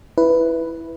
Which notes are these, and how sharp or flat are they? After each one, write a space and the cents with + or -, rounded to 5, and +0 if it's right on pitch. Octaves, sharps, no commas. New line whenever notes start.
E4 +0 B4 +0